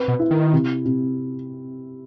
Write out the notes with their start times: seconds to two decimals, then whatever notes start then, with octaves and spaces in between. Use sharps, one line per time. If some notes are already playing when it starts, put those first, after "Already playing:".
Already playing: C4 B4
0.08 B2
0.19 E4
0.31 D#3
0.53 C3
0.85 C3